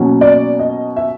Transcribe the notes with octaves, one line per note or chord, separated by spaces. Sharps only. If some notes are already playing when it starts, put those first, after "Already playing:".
Already playing: B2 F#3 A#3 C#4
D5
D#5
E5